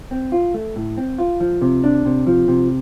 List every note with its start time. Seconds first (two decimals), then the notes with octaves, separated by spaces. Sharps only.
0.11 C4
0.32 F4
0.54 A3
0.76 A2
0.98 C4
1.19 F4
1.40 F3
1.62 C3
1.84 D4
2.05 C3
2.27 F3
2.48 C3